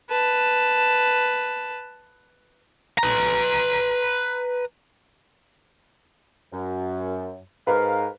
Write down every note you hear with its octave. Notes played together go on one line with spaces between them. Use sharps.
B4 A5
B4 A#5
F#2
G#2 A#4 B4 F5